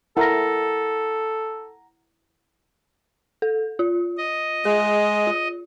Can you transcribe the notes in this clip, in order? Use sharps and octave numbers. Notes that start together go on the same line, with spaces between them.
E4 A4 A#4 F#5 A#5 A#6
A4
F4
D#5
G#3 G#4
F4